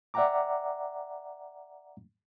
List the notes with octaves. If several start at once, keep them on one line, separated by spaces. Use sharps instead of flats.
D5 E5 F#5 G5 A#5 D6